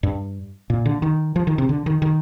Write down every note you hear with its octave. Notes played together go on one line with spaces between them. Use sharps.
G2
A#2
D3
D#3
F3
D#3
C3
D3
D#3
D#3